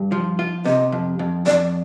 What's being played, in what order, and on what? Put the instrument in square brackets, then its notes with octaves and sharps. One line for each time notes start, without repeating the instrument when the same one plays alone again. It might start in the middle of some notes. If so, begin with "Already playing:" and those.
Already playing: [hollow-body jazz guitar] G2
F3
F4
[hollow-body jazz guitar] C3 [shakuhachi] D#5
[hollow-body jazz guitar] F2
F2
[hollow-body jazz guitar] F2 [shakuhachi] D5